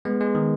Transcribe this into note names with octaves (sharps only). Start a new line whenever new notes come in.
G#3 B3
G#3
D#3